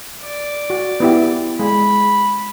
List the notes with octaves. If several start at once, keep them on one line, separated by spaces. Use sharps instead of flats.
D5
F#4
B3 E4 G4
G#3 B5